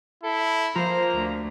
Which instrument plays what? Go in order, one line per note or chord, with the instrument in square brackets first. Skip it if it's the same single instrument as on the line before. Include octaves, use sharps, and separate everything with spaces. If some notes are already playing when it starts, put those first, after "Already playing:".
[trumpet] E4 [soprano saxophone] A4
[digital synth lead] F3 [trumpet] A#3 [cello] C5 [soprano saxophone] A#5
[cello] D2